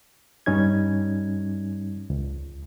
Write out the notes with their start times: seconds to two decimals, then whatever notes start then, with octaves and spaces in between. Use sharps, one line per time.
0.46 G2 G3 C#4 D#4 G#6
2.10 C#2